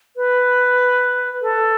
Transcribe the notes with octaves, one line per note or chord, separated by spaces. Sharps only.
B4
A4